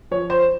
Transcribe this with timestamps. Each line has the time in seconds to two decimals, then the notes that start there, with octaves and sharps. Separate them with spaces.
0.11 F3 C#5
0.30 C5